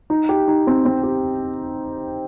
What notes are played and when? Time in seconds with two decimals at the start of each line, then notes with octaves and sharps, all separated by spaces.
0.10 D#4
0.29 G4
0.48 D#4
0.67 C4
0.85 C4
1.03 G4